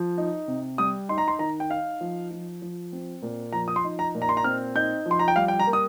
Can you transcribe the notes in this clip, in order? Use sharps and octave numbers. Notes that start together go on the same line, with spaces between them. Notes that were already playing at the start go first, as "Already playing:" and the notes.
Already playing: F3
D#4
C3
G3 D#6
D#4 C6
A#5
C6
D#3 A#5
G5
D#4 F5
F3
F3
F3
C4
A#2
F3 A#5
D#6
C6
D#4
A#5
A#2
A#5
C6
A#5
C4 F6
D#4 G6
F3
C6
A#5
G5
G3 F5
G5
A#5
A#3
D#6